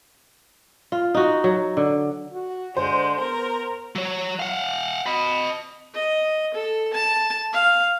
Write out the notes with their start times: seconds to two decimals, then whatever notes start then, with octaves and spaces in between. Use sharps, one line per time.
0.92 F4
1.14 D#4 F#4
1.44 F#3
1.77 D3
2.32 F#4
2.77 D3 G#3 C5
3.21 B3 A#4
3.95 F#3 C#5
4.39 F5 F#5
5.06 D#5 B5
5.94 D#5
6.54 A4
6.93 A5
7.53 F5